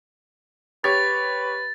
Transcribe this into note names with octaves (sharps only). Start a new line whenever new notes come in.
G4 B4 C#5 A6